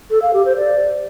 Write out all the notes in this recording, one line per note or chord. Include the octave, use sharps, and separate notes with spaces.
A4
F5
G4
C5
D5